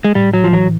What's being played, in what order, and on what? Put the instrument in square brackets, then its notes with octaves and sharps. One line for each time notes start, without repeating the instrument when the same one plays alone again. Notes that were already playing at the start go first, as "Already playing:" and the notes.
[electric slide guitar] G#3
[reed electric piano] A2 [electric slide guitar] G3
[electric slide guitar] F#3
F3
[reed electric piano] E3 [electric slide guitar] F#3